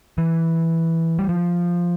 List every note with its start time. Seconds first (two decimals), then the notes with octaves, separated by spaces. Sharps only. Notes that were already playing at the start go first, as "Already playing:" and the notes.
0.18 E3
1.19 G3
1.29 F3